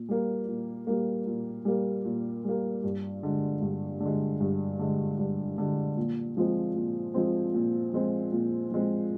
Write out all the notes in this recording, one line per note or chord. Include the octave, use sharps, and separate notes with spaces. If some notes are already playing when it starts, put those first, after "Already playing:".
Already playing: A#2
G3 A#3
A#2
G3 A#3
A#2
G3 A#3
A#2
G3 A#3
G2
D3 G#3
G2
D3
G#3
G2
D3 G#3
G2
D3 G#3
A#2
F3 G#3 C4
A#2
F3 G#3 C4
A#2
F3 G#3 C4
A#2
F3 G#3 C4